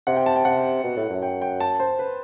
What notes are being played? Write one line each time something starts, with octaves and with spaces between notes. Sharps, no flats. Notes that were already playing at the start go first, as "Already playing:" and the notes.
C3 F#5
G5
A5
G5
C3 F#5
B2
A2
F#2
G5
G5
A5
C5
B4